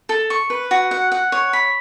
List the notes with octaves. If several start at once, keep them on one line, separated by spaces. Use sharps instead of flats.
A4
C#6
B4
F#4
F#5
F#5
C#5
B5